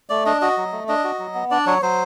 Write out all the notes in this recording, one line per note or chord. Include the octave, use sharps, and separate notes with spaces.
A3 D5
D4 D#5
F#4 D#5
F#3
A3
D4 D#5
F#4
F#3
B3
D4 D5
F#3 C#5
F#3 C5